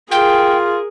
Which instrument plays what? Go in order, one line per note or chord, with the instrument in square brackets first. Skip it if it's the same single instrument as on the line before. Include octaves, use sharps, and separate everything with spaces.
[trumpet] F4 [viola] G#4 A#4 [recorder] G5